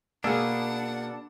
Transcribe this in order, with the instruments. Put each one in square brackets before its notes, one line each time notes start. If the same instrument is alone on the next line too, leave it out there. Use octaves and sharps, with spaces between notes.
[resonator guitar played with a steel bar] B2 G#4 [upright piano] A#3 E6 [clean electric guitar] D4 [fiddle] F#5